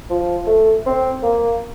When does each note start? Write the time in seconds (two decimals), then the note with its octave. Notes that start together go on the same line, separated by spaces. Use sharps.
0.10 F3
0.47 A3
0.86 C4
1.23 A#3